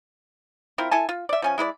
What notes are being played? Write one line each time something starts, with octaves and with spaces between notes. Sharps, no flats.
C4 E4 F4 A#4
E4 A4 G#5 A5
F4
D5 E5
F3 C#4 G#5
G#3 E4 B4 D5